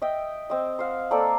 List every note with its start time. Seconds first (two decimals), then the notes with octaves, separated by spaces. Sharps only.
0.02 D#5 E5 G5
0.50 C4 D#5
0.79 C5 F5 F#5
1.11 A#3 C4 A4 D5